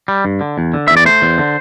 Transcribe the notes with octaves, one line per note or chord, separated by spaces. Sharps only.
G3
G2
D3
E2
D3
E2 E5
D5
A3 C5
E2
D3